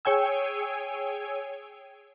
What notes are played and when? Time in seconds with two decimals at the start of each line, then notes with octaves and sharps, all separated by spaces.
0.05 G#4 C#5 G5 G#5 E6